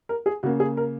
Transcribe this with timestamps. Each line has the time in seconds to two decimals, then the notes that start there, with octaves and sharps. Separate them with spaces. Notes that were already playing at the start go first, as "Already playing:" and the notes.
0.09 A#4
0.26 G#4
0.43 C#3 A#3 F#4
0.60 G#4
0.77 A#4